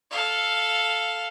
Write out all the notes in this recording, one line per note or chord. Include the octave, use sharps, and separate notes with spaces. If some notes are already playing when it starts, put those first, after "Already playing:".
A4 F5